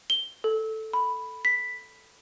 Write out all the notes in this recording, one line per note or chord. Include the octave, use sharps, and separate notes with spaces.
G7
A4
B5
B6